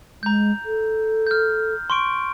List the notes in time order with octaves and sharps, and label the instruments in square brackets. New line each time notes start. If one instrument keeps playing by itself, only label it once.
[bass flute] G#3 [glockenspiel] A#5 G6
[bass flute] A4
[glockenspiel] F6 G6
C6 C#6 D7